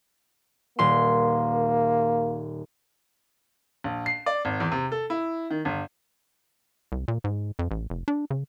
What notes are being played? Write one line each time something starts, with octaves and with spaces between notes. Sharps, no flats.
D#1 A#3 C6
A#1
C7
D5
G#1
E2
C3
A4
E4
D#3
G1
C2
A#2
G#2
F2
A1
F1
D4
C#3